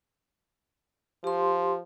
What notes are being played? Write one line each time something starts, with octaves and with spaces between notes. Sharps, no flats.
F3 G4 C6